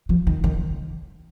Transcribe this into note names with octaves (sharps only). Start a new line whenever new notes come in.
F3
D#3
D#3